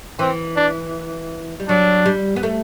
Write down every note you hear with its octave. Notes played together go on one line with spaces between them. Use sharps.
E3 C4
D4
G3
F#3 D4
G3
B3
A3